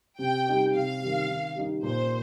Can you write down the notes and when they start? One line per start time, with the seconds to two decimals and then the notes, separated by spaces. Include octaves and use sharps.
0.19 C3 G5
0.46 G3 D#4 G4
0.74 C3 F5
1.01 D#3 G3
1.28 D#3
1.55 G3 D#4 G4
1.83 A#2 C5